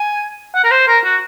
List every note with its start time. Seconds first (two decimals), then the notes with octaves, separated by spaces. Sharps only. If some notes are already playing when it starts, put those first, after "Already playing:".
Already playing: G#5
0.54 F#5
0.64 A#4
0.71 C5
0.87 A#4
1.04 F#4